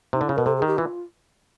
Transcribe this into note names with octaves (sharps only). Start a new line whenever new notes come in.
C3 D#4
D3
E4
C#3
B2 A#4
C3 A4
G#4
D#3
G4
E3 F4